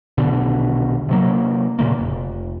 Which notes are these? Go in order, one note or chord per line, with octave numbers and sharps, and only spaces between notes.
D#1 B1 B2 D3
C3 F#3 A#3
A#2 C#3 E3 A#3
F1